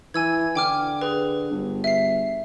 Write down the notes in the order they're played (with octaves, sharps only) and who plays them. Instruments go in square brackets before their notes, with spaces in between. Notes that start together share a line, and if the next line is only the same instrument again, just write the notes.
[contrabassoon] E3 [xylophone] G#5 E6 G#6
[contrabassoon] D3 [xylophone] G5 D6 F6
[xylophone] G#4 B4
[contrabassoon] G1
[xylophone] E5 C7